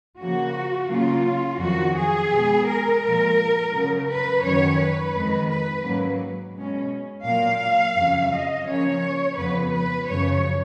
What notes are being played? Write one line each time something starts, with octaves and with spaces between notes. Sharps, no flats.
C#3 F3 A#3 F#4
C#3 F#3 A#3 C#4 F4
F2 D#3 F#3 F#4
G#4
B2 G#3 B3
A#4
A#2 F3 G#3
C#3 F#3 C#4
B4
F#2 D#3 F#3 C#4 C#5
B4
F2 D#3 G#3
B4
G#2 F#3 A#3 C#4
B2 G#3 C#4
A#2 F#3 A#3 F5
F2 C#3 F#3 C#4
D#5
C#3 F3 A#3 C#4 C#5
F2 C#3 F3 B3 B4
B4
F#2 C#3 F3 C#5